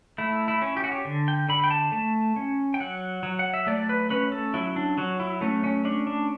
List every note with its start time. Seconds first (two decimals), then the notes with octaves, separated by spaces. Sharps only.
0.18 A3 E4
0.48 E4
0.62 C#4
0.77 G4
0.84 F#4
0.92 G4
1.05 D3
1.28 G5
1.49 D3 B5
1.64 G5
1.71 A5
1.92 A3 A5
2.36 C#4
2.74 G5
2.80 F#3 F#5
3.23 F#3
3.39 F#5
3.54 E5
3.67 A3 D5
3.89 B4
4.10 C#4 B4
4.32 A4
4.54 F#3 E4
4.76 D4
4.98 F#3 F#4
5.20 E4
5.41 A3 C#4
5.64 C#4
5.84 C#4 D4
6.07 D4